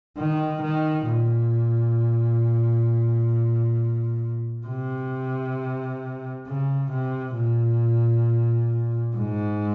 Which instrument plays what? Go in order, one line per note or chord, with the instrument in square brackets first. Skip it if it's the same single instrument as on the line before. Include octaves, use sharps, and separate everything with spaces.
[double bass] D#3
D#3
A#2
C3
C#3
C3
A#2
G#2